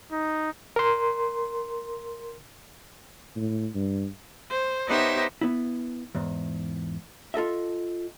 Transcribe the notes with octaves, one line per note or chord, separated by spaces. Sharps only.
D#4
A#4 C6
A2
G2
C5
B3 D#4 G4 C5 C#5 E5
B3 E4
E2 G#2
F4 A4 D#5 E5